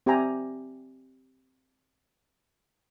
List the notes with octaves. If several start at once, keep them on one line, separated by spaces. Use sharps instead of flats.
C4 G4 E5 G5 G#5 A#5